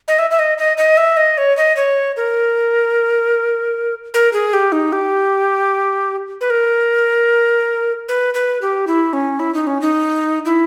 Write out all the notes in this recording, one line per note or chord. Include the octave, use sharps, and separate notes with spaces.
D#5
E5
E5
D#5
D#5
D#5
E5
D#5
C#5
D#5
C#5
A#4
A#4
G#4
G4
D#4
G4
B4
A#4
B4
B4
G4
E4
C#4
E4
D#4
C#4
D#4
E4